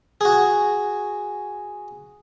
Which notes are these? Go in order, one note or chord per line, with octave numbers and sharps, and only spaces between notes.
F#4 G#4